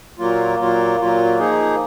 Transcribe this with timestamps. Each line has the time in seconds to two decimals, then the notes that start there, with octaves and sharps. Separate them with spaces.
0.19 A#2 F#3 A#3 F4
0.59 A#2 F#3 A#3 F4
1.00 A#2 F#3 A#3 F4
1.39 F3 A#3 D#4 G#4